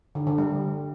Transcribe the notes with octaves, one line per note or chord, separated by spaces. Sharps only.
D3
D3
G3